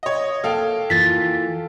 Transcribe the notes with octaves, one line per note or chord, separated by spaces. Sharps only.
C#5 D#5
A#3 A4 F5 G5
E3 A#3 F4 A6 B6